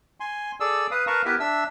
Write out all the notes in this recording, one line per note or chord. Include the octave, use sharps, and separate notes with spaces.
G#5 C6
G#4 A4 D5 E6
B4 F5 D#6
A#4 B4 F5 A5 A#5 C#6
B3 E4 G4 A#4 B4 E5
D4 E5 E6